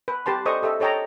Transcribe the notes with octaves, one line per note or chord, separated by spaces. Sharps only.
B4
G4 B4 A5 C6
A4 C5 D5 D#5 C#6 D#6
G4 A4 D#5 E5
A4 C#5 D#5 G5 A5 A#5